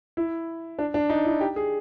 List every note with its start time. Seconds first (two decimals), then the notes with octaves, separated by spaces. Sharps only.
0.17 E4
0.79 D4
0.94 D4
1.10 D#4
1.25 E4
1.41 G4
1.56 G#4